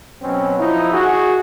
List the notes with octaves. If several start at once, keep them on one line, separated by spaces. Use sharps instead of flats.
B2 F#3 C4 C#4
F3 D#4 E4
F#4 G#4